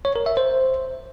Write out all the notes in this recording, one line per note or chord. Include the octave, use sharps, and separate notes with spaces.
C#5
A#4
E5
C5